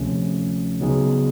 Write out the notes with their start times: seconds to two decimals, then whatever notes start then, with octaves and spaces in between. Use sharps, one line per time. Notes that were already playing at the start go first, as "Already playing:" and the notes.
Already playing: D2 C3 F3 A3 C#4
0.80 C#3 F#3 B3 D#4 G#4